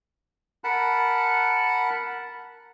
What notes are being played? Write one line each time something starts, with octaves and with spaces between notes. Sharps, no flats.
A#4 F#5 A5 B5 F#6